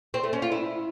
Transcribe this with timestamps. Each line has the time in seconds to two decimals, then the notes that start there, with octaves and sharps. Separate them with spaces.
0.14 C4
0.23 A3
0.33 C#4
0.42 F4
0.52 E4